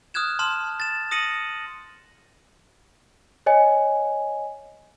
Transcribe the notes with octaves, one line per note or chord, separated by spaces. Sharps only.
D#6 F6 F#6 G#6 E7
A5 C6 F6 E7
A6 E7
D#6 A#6 C#7 D#7 F#7
C#5 D#5 G#5